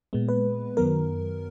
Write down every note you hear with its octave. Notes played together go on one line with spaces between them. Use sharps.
A#2 G#3 B3
B4
F#2 D#3 F#3 B3 A#4